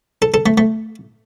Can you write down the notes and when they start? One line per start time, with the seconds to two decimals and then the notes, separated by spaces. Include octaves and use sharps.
0.22 A4
0.34 A4
0.46 A3
0.58 A3